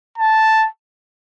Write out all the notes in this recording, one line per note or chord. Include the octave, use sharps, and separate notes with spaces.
A5